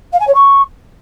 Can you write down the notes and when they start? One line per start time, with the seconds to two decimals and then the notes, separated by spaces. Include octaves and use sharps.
0.12 F5
0.20 G#5
0.27 C#5
0.34 C#6